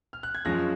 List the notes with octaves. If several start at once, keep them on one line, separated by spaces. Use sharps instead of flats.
F6
F#6
G#6
F#2 F3 G#3 C#4 F#6 A#6